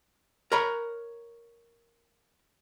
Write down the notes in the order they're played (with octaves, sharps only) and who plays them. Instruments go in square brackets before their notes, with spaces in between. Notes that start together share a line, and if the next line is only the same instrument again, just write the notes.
[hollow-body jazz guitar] A#4 C#5 A#5 B5